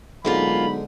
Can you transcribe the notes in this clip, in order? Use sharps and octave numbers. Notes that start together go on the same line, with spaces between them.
B1 G#2 D3 G#3 A#3 F4 B5